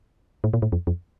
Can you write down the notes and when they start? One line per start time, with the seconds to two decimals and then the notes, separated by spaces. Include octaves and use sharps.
0.44 A2
0.53 A#2
0.62 A2
0.72 F2
0.87 F2